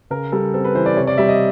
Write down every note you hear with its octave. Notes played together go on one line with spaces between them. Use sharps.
C#3 A#4
G3 A4
C4 A4
B4
E3 C5
D5
C3 C#5
D5
G3 E5
D#5